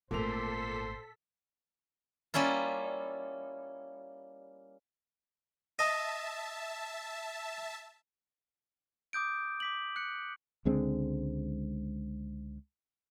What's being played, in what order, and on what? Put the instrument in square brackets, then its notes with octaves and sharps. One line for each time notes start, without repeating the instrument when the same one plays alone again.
[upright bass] G#1 A3 [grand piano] A#2 A#3 F7 [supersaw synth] A4 B6 [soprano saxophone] C5
[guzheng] G3 A#3 C#4 E4 F4
[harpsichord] D#5 [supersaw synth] E5 A5
[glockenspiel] D6 D#6 G6 D7
D6 B6 F#7
F#6 C#7
[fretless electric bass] C#2 D3 G#3 C4